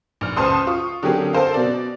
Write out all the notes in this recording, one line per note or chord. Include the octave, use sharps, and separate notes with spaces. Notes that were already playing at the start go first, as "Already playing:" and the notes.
A#1 F6
C#2 C5 A5 C6 D#6
F4 C#6
D3 F#3 C4 G4 G#4 A#4
A4 A#4 C5 F5
B2 D5